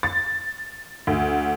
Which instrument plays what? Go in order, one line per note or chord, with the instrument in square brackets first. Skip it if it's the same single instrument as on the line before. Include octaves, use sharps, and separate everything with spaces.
[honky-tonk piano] A6
D2